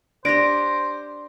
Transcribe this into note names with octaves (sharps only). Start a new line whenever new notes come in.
D4 G4 C5 D5 A#6 D7